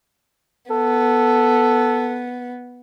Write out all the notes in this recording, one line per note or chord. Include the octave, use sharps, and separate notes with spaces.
B3 A4